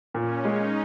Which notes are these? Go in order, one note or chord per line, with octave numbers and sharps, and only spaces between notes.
A#2 C#4
G#3 D#4